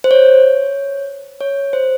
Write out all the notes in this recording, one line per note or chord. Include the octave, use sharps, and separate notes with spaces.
C5
C#5
C#5
C5